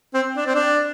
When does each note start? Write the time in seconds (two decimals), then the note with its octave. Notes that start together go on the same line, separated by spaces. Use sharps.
0.14 C4
0.36 D4
0.46 C4
0.55 D4